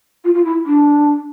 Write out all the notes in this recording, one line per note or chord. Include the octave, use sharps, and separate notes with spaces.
F4
F4
E4
D4